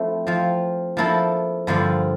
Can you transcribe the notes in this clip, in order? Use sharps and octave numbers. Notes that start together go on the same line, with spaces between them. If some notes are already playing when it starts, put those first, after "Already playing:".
Already playing: F3 A3 C4 E4
F3 C4 F4
F3 A#3 E4 A4
G2 D3 F3 A#3 F4